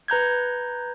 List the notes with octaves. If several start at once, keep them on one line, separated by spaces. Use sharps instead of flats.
B4 A#5 G6 G#6